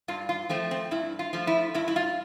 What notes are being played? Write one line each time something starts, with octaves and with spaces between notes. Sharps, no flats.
G2 F4
F4
F3 A3 C4
C4
G2 E4
F4
F3 A3
E4
G2 E4
E4
F4